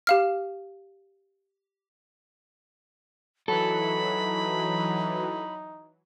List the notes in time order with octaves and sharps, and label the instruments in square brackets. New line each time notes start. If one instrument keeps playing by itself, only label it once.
[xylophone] G4 F5 F6
[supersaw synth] E3 F#3 [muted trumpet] D#4 [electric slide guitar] A4 [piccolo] B5